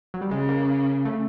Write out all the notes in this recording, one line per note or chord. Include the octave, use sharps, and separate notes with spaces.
F#3
G3
C#3 G#3
A#3
A#3
A3